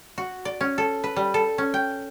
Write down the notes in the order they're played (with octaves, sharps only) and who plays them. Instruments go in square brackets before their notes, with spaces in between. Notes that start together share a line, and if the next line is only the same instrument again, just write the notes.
[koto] F#4
D5
C#4
A4
B4
G3
A4
C#4
G5